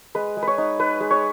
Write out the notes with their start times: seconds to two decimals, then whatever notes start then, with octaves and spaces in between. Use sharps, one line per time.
0.15 G#3 B4
0.37 G#3
0.43 B4 C#5
0.58 D#4
0.79 D#4 B4
1.00 G#3
1.10 C#5